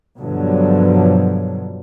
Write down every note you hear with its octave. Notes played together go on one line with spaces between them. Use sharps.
G2 B2 D3 F3 F#3